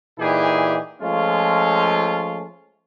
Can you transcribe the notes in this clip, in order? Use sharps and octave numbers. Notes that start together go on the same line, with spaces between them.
A#2 E3 D#4 E4 G4 G#4
F3 G#3 A3 C#4 F4